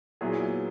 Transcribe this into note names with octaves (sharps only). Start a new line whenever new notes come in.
A#2 F#3 B3 E4 G#4